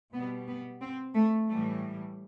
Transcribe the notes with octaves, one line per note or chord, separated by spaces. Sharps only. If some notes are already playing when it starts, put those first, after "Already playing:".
B2 G3 B3
B3
C4
A3
A2 E3 G3 A3